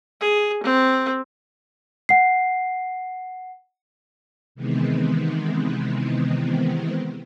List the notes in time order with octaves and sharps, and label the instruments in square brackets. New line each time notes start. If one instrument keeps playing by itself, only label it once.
[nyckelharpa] G#4
C4
[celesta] F#5 C7
[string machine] C3 D#3 E3 G#3 B3 C4